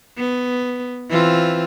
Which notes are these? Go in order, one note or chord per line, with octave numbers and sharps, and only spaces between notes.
B3
E3 C4 F4